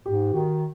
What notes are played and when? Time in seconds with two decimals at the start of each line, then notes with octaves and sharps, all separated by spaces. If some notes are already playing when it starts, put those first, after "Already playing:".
0.06 G#2 G4
0.34 D#3 F#4